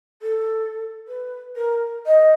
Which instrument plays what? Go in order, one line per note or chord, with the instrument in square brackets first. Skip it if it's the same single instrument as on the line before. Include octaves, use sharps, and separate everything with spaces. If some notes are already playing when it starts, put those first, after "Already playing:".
[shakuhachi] A4
B4
A#4
D#5